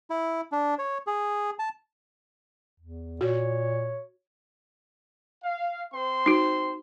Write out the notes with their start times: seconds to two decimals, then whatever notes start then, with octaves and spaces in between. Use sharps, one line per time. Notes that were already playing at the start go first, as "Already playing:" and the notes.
0.10 E4
0.52 D4
0.79 C#5
1.07 G#4
1.59 A5
2.80 E2
3.21 A#2 F#4 C#5
5.44 F5
5.93 C4 C5 C6
6.26 D#4 F#4